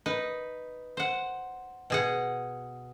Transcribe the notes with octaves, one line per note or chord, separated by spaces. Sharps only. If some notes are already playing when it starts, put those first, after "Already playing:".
D#4 B4
C5 F#5
B2 G#4 F#5